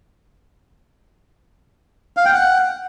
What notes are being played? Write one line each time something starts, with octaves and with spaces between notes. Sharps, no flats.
F5
G5
F#5